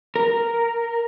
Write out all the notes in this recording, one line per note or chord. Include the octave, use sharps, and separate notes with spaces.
A#4